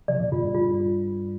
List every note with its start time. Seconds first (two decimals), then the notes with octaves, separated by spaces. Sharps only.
0.08 C3 F3 D5
0.20 A#2 D3
0.32 G2 C3 F4
0.39 A#2
0.43 G2
0.55 F4